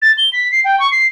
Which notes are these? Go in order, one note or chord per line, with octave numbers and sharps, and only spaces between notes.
A6
G7
B6
C7
G5
C#6
C7